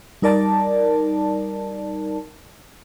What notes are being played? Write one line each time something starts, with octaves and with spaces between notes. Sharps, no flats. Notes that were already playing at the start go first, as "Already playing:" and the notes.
G3 D#4 A#4 D5 A5